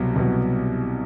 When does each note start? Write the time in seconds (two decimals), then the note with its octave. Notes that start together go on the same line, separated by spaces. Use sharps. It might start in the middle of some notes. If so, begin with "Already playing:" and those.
Already playing: C2 B2 F#3
0.16 C2 B2 F#3